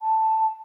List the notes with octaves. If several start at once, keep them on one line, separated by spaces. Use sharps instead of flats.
A5